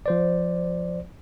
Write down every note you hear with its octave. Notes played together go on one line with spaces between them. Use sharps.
F3 C5 D5